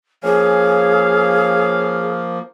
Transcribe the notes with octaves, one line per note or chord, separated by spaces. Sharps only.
F3 A#3 C#4 G#4 F5